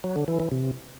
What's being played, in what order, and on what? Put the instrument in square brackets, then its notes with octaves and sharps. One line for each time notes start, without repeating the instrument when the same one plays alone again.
[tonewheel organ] F#3
D3
E3
E3
C3